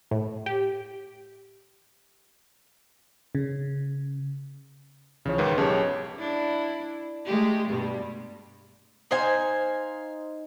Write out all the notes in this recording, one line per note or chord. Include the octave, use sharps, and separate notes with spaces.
A2
G4
C#3
C#2 C#3 E3 F3 C#5
C#2 G#2 D#3 B4
B1 C#4 G4 G#4 C#5 A5
D4 E4
G#3 A3 G4
G2 B2 G3
D#4 C5 F5 G#5